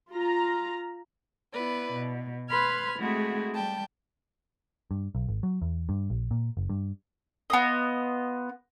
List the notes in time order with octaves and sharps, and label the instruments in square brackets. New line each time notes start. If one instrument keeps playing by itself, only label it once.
[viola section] F4 A#5
[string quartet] B3 E4 B4 D5
B2
B4 B5 C6 F6 G#6
G#3 A3 C4 E4 F#4 G#4
G3 G5 A5
[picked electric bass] G2
B1
G#1
F#3
E2
G2
A#1
A#2
F#1
G2
[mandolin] B3 F4 D#5